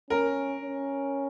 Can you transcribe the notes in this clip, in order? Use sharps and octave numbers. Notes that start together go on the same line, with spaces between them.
C#4 A#4
C#4